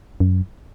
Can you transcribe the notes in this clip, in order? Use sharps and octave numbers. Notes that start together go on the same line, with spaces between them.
F#2